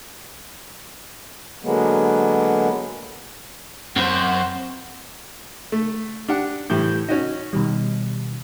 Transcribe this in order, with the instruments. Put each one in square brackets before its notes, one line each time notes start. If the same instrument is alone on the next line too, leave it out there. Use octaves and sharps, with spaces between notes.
[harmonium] D3 F#3 G#3 A#3 B3
[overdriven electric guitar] F#2 [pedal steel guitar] C4 B5 G6 [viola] C5 [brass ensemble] F#5
[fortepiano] A3
D4 G4 F#5
[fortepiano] A2 E3 G3 [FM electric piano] G6
[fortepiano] C#4 F#4 D#5 [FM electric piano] D#4
[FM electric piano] B2 D#3 G3